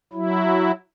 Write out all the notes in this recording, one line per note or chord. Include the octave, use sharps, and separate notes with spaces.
F#3 E4